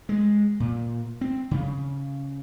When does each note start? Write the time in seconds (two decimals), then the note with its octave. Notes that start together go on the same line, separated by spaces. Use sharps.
0.09 G#3
0.60 A#2
1.21 C4
1.51 C#3